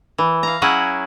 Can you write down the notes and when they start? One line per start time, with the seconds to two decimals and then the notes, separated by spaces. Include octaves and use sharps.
0.18 E3
0.43 F5 A#5
0.62 F#3 C#4 E4 G#4 F#5